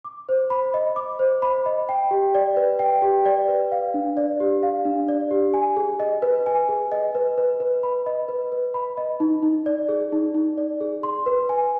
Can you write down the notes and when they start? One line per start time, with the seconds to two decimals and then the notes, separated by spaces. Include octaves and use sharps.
0.05 D6
0.29 C5
0.50 B5
0.74 D#5
0.96 D6
1.19 C5
1.42 B5
1.66 D#5
1.89 G5
2.11 G4
2.35 D5
2.57 B4
2.79 G5
3.02 G4
3.25 D5
3.48 B4
3.72 F5
3.94 D4
4.17 D5
4.40 G4
4.63 F5
4.85 D4
5.08 D5
5.31 G4
5.54 G#5
5.77 G#4
6.00 D#5
6.22 B4
6.46 G#5
6.69 G#4
6.92 D#5
7.15 B4
7.38 B4
7.60 B4
7.83 B5
8.06 D#5
8.29 B4
8.52 B4
8.74 B5
8.97 D#5
9.20 D#4
9.43 D#4
9.66 D5
9.89 G#4
10.12 D#4
10.34 D#4
10.57 D5
10.81 G#4
11.03 C6
11.26 B4
11.49 G#5